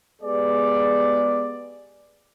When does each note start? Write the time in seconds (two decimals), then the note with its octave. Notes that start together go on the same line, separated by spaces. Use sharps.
0.22 G#3 B3 G4 G#4 D5